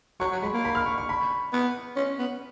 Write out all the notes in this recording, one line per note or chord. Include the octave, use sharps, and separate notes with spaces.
F#3 C#6
F#3
G#3 B5
A#3
B5
F6
C#6
C#6
B5
B3
C#4
B3